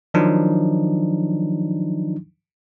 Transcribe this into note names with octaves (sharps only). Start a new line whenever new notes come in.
D#3 F3 F#3 D4 D#4